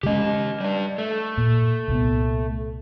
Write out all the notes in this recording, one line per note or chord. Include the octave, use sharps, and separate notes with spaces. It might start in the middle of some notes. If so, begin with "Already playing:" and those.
C#3 G#3 C#4 G4 D#5
G3 D4
A3
A#2
C2 A#2 B3